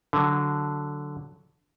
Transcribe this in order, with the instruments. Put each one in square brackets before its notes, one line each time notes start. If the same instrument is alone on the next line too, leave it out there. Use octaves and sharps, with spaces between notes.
[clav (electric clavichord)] D3 F#3